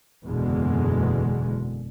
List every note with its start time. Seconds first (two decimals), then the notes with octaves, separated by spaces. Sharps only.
0.24 F#1 E2 B2 D3 G#3